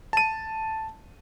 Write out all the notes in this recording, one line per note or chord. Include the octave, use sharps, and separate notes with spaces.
A5 D#7